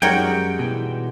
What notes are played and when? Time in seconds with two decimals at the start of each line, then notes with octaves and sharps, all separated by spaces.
0.02 F#2 G3 G#3 D#4 F#4 A#4 C#5 G5
0.59 B2 E3